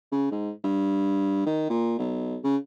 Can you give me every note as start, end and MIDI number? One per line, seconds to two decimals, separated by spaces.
0.11 0.27 49
0.31 0.51 44
0.64 1.46 43
1.46 1.66 51
1.70 1.98 46
1.98 2.37 35
2.44 2.57 49